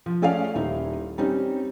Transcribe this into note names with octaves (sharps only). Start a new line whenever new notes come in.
F3
A3 C#4 G#4 A4 D5 F5
D#1 D#4 E4
G3 C4 C#4 D#4